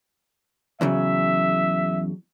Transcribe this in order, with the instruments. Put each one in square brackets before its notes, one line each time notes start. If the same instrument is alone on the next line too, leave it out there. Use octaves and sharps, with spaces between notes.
[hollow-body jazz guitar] E2 C#3 F#3 [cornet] E5